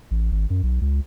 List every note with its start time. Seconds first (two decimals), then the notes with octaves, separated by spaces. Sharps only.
0.11 A1
0.32 G#1
0.50 F#2
0.63 B1
0.81 C#2